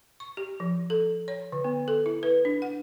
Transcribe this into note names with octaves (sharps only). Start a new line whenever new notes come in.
C#6
G4
F3
A4
C#5
D3
B3
A4
E4
B4
D4
F#5